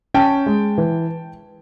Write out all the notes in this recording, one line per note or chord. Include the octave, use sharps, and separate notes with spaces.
C#4 G5 A5
G#3
E3